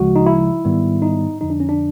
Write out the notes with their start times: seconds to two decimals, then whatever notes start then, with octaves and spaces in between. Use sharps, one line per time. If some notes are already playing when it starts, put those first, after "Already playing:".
Already playing: D2 C#3 F3 G#3 F#4
0.16 D#4
0.27 E4
0.65 G#2 D#3 G3 B3
1.02 D#4
1.41 F2 D3 F3 D#4
1.50 D4
1.60 C#4
1.69 D4